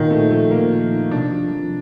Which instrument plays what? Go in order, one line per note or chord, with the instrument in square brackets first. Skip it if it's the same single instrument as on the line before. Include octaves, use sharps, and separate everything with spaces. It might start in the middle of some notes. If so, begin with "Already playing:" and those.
Already playing: [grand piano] A#2 [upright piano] D#3
[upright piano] A3 [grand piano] C4
[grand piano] F3 [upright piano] A3
[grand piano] A#2 [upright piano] A#3
[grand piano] F3
D#4
[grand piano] C3 [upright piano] D4
[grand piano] F3
F3